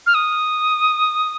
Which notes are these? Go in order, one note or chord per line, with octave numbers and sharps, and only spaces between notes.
F6
D#6